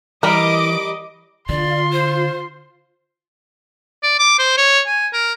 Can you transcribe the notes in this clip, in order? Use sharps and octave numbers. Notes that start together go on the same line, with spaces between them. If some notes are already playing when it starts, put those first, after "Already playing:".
E3 G3 A#4 D#5 D6
D3 F4 D5 C6
C5
D5
D6
C5
C#5
G#5
A#4